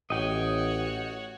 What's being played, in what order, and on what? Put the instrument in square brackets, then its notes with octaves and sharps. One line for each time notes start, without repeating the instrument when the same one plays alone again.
[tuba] A1 [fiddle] F#4 C#5 [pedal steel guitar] D#5 G5